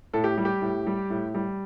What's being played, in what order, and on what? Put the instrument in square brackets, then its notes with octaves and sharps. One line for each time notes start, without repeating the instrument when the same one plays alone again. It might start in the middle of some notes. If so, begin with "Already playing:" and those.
[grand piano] A2 A4
G4
G3
G4
A2
G3
A2
G3